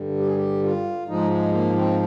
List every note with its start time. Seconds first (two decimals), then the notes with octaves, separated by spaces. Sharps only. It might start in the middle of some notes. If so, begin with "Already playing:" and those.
Already playing: G2 D3 G3
0.19 G4
0.27 G#4
0.36 G4
0.64 F4
1.08 G#2 F3 G#3 D#4
1.30 G#3
1.52 A#3
1.76 C4